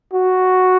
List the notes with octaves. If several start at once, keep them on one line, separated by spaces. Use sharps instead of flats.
F#4